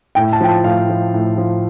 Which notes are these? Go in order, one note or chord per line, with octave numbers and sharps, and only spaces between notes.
A2 G5
A5
F3 G5
A5
A2 F5
F3
A2
F3